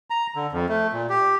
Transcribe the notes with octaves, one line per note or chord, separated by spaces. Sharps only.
A#5
D3
F2
A3
A#2
G4